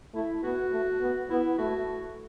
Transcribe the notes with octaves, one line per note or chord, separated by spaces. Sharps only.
A3 E4
B3 F#4
A3
B3
B3 E4
A3 F#4